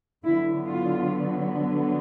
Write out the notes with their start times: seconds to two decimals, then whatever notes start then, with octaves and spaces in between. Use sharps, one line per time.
0.24 D3 F#3 B3 E4
0.66 F4